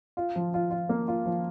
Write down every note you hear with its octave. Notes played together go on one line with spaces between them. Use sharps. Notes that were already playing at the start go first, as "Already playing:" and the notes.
F4
F3
F4
F4
A#3
F4
F3